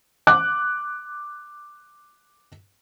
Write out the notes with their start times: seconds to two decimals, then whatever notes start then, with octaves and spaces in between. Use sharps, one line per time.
0.27 D6 F#6